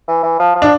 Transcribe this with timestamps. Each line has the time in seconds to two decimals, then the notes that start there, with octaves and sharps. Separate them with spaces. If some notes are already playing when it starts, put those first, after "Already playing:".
0.08 E3
0.23 E3
0.39 F3
0.55 F3
0.62 D4